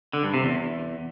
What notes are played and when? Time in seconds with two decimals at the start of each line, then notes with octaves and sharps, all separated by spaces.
0.13 D3
0.24 G2
0.34 C3
0.44 E2